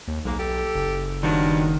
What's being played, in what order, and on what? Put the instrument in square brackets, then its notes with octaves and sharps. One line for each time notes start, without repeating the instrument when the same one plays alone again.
[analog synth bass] D#2
[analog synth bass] B1 [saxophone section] G#2 A#3
[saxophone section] G4 A4
[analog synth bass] F#1
[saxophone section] G2 F#3 D4 [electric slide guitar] D#3